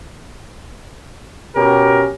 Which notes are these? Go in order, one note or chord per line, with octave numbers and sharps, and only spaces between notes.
B2 C#4 G4 A#4